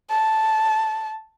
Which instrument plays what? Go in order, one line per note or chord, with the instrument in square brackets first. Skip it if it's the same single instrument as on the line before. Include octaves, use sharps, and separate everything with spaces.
[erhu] A5